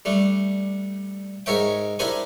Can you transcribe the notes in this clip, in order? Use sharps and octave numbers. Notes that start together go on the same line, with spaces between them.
G3 A3 D4
G#2 G#4 A#4 C#5 E5 G5
D4 E4 G4 A#4 C5 G#5